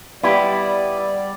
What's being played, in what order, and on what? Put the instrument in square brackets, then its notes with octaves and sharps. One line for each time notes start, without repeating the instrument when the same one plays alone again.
[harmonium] G3 D5 [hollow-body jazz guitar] B3 G4 [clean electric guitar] E4